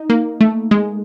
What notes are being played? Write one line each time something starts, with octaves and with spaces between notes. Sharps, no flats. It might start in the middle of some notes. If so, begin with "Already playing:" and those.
Already playing: D#4
A#3
A3
G#3